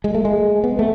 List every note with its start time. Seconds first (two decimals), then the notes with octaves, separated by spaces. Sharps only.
0.04 G#3
0.14 A3
0.25 G#3
0.64 B3
0.79 A3